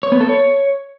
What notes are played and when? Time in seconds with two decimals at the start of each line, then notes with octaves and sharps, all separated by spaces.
0.03 C#5
0.12 B3
0.20 A4
0.29 C#5